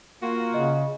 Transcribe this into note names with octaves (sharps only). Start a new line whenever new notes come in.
A#3 F4 F#4
C#3 D#5